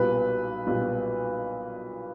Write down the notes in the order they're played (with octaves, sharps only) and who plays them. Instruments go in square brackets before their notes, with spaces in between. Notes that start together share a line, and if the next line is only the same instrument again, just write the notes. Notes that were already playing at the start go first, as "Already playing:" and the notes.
Already playing: [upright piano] B1 A#2 G3 [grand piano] B4
[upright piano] B1 A#2 G3